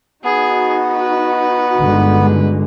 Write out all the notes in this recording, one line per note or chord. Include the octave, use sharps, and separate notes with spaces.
B3 D#4 F#4 G#4
B4
G1 D3 G#3